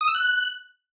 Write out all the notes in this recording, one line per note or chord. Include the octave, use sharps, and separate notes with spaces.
D#6
E6
F#6